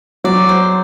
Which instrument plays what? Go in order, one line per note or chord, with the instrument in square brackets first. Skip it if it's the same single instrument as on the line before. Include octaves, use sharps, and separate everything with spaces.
[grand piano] F#3 [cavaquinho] D5
[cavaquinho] C5